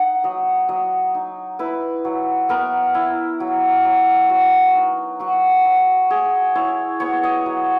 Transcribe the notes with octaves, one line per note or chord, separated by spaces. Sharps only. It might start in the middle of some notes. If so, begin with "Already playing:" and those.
Already playing: D#4 F#5
F#3 D#5
F#3 D#5
D#4
E4 B4
F#3
B3 A#4
E4
F#3
F#3
F#3 F#4
D#4
F#3 F#4
F#3
F#3 G#4
E4 C#5
B3 C#5
D#5
F#3